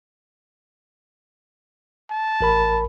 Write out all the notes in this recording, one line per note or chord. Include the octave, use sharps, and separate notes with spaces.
A5
A1 A#4 B5